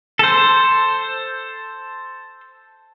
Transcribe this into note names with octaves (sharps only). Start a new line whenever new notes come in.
A4 C5